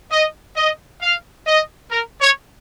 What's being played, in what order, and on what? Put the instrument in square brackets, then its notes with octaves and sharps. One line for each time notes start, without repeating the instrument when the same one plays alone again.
[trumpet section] D#5
D#5
F5
D#5
A#4
C#5